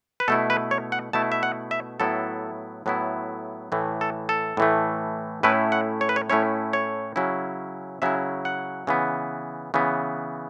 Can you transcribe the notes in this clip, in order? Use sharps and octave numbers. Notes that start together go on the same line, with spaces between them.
B4
B2 A3 E4 A4
B4
C#5
F#5
B2 A3 E4 A5
E5
F#5
E5
A2 F#3 B3 E4 A4
A2 F#3 B3 E4
A2 E3 A3
A4
A4
A2 E3 A3
A2 A3 C#4 E4 B4
F#5
C#5
B4
C#5
A2 A3 C#4 E4 C#5
C#5
C#3 F#3 C#4 E4
C#3 F#3 C#4 E4 E5
F#5
C#3 E3 B3
C#3 E3 B3